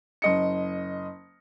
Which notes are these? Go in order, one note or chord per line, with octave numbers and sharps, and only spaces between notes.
F#1 D#5 C#7